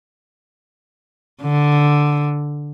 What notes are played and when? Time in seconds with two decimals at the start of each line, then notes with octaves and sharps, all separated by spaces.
1.42 D3